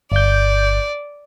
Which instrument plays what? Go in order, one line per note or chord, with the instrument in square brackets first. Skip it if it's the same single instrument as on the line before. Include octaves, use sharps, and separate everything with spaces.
[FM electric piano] G1 G6 [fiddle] D5